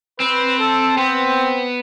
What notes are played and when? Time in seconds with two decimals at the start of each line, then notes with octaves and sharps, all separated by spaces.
0.20 C4 B4
0.59 A4
0.97 B3 C4